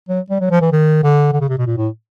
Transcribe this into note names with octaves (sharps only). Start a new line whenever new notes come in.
F#3
G3
F#3
F3
E3
D#3
D3
D3
C#3
C3
B2
A#2
A2